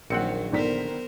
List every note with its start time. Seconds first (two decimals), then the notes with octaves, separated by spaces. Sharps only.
0.10 A#1 D#3 F#3 A#3 C4 F#5 C#7
0.52 D3 D#3 B3 A#4 C5 B6